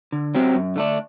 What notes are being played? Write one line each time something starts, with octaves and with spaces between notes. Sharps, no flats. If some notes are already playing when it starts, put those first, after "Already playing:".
D3
F#3 C4 G4
F#2
D3 A3 D4